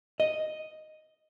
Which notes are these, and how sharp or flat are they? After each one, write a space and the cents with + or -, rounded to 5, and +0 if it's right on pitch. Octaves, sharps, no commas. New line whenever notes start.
D#5 +0